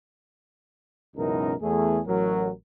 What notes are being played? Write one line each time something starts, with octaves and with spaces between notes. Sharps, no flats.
C#2 F#2 B2 E3 D#4 A#4
E2 A3 G#4
A1 F#3 A#4